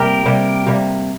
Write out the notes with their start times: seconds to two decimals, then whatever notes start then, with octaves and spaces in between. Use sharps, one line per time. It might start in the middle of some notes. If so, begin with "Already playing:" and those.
Already playing: C3 G3 A#3 G4 A#4
0.25 C3 G3 A#3
0.67 C3 G3 A#3